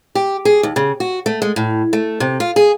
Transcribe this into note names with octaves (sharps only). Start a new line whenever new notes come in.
G4
G#4
D#2
C#3
F#4
A3
G#3
A2
A3
C3
F4
G#4